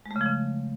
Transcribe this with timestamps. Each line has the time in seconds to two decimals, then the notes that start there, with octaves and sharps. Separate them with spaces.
0.06 G#3
0.11 A3
0.16 C#3
0.21 F3
0.26 C#3